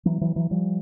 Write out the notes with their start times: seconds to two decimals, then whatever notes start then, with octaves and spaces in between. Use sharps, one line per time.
0.05 E3 F#3
0.21 E3 F#3
0.36 E3 F#3
0.51 F3 G3